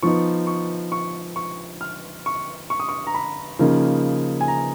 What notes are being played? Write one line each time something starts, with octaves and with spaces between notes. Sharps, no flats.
F3 B3 D#4 C#6
C#6
C#6
C#6
F6
C#6
C#6
D#6
C#6
A#5
B5
C#3 F3 A#3 D#4
G#5
A#5